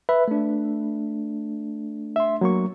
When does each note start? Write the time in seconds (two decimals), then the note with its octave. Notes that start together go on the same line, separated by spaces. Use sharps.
0.09 B4 E5 B5
0.28 A3 D4
2.16 E5 C6
2.41 F#3 A#3 C#6